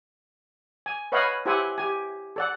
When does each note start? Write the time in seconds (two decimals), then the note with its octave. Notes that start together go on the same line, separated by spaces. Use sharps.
0.86 G#5
1.12 B4 C#5 D#5 F5 F#5 B5
1.46 E4 G4 C5 E5 F#5 G#5
1.78 G4 G#5
2.36 A4 D5 F#5